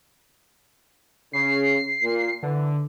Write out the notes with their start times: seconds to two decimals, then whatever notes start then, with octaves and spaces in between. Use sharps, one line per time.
1.33 C#3 C7
2.02 A#2
2.43 D3 E3